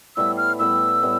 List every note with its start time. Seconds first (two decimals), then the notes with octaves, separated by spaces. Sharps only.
0.16 A2 G3 B3 E4 E6
0.37 F6
0.59 A2 G3 B3 E4 E6
1.02 A2 G3 B3 E4